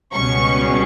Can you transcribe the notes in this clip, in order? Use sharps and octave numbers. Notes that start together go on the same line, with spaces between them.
C#2 B2 G3 C#4 C#6